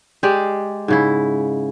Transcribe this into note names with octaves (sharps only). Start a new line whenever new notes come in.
G#3 G4 D5
G#2 C#3 E4